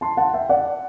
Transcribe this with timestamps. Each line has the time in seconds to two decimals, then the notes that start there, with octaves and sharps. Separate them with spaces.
0.01 A5 C6
0.17 F#5 A5
0.34 E5 G5
0.49 D5 F#5